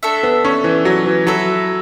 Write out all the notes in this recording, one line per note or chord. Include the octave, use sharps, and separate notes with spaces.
A3 D4 A4 E5
B3
C#4
E3
F#3
E3
F#3 E4 A4 E5